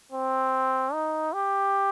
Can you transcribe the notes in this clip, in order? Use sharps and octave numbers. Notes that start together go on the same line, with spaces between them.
C4
D#4
G4